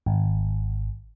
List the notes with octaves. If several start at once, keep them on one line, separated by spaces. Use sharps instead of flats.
G#1